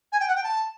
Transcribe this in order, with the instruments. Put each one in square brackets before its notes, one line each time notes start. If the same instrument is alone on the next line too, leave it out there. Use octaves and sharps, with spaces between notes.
[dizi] G#5
G5
F#5
G5
A5